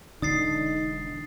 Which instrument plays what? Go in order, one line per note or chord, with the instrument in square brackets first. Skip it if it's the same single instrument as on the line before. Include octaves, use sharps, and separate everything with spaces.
[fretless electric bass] E1 D3 D4 [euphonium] D#4 [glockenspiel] D#6 A6 C7